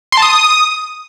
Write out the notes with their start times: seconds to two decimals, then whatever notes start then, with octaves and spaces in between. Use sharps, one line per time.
0.12 C6
0.17 A5
0.22 D#6